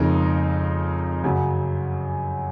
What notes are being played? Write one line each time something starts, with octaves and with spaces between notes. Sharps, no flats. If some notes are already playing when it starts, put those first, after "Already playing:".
Already playing: F2 C#3 G#3 D#4 A#4
F#2 C#3 F#3